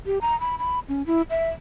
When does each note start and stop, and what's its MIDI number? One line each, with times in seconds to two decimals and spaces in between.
0.06 0.18 67
0.21 0.38 82
0.40 0.56 83
0.59 0.79 83
0.89 1.05 61
1.07 1.22 64
1.30 1.50 76